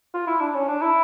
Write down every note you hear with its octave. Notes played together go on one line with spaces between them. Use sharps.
F4
E4
D4
C#4
D4
E4